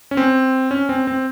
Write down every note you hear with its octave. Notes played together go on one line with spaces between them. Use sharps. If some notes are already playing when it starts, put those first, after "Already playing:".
C#4
C4
C#4
C4
C4